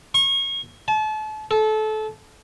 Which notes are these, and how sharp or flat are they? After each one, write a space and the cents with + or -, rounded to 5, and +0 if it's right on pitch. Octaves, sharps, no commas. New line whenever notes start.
C#6 -30
A5 -35
A4 -25